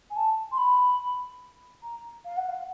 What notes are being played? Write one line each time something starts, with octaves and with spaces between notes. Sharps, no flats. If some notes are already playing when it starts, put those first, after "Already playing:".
G#5
A5
C6
B5
A#5
F5
F#5
F5